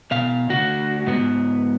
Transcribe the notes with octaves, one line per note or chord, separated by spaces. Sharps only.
B2 F5
D2 F#4
G#2 B3